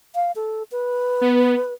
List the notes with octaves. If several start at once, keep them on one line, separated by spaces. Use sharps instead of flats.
F5
A4
B4
B3